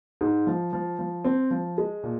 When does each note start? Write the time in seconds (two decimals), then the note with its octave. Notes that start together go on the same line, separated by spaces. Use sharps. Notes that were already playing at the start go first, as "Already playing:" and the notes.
0.21 G#2
0.47 F3
0.73 F3
0.99 F3
1.24 C4
1.51 F3
1.78 G#3
2.03 A#2